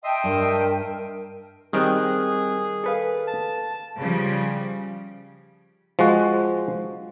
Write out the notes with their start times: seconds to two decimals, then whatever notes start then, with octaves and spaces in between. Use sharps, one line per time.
0.04 D#5 E5 G5 A5 C6
0.24 G2 A#4
1.73 D#3 G3 C4 G#4 G5 F#6
2.84 A4 B4 F5
3.27 A5
3.97 C#3 F3 G3
5.99 F3 G#3 F#4